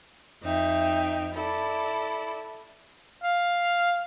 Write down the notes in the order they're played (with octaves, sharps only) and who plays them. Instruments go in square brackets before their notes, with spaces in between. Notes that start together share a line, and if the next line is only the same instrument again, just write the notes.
[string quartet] F2 D#4 E5 G5
E4 A4 D5
[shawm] F5